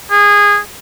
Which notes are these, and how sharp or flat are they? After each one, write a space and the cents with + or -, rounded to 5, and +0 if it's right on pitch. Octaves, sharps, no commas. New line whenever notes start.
G#4 -20